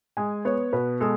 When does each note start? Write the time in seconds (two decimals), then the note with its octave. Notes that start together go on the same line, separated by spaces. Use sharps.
0.17 G#3 G#5
0.45 B3 C#5
0.73 B2 B4
1.00 G#3 A4